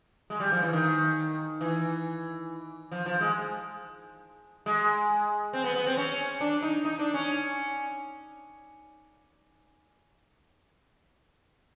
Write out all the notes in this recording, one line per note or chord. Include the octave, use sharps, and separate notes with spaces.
G#3
G3
F3
E3
D#3
E3
F3
F3
G#3
G#3
C4
B3
B3
C4
C#4
D4
D#4
D#4
D4
C#4